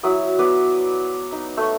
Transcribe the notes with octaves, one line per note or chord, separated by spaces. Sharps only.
F#3 E4 D#6
B3 B4 D5
D#4
A3 C#6